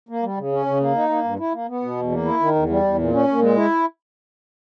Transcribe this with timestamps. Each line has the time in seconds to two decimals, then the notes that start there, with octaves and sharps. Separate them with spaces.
0.09 A#3
0.23 G3
0.37 C#3
0.52 C#4
0.66 C#3
0.80 A#3
0.95 D#4
1.09 A#3
1.24 G2
1.39 E4
1.53 A#3
1.68 B3
1.82 B2
1.97 E2
2.11 A#3
2.25 E4
2.40 D#3
2.55 E2
2.69 G3
2.84 E2
2.98 A#2
3.12 C#4
3.28 A#2
3.41 G#3
3.56 E4